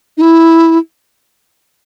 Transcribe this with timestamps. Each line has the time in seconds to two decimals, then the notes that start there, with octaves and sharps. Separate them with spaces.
0.17 D#4
0.21 E4